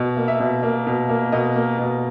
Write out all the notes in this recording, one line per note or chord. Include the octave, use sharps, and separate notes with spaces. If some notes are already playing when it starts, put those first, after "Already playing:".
Already playing: B2
A#3
E5
B2
A#3
B2
A#3
B2 D#5
A#3
B2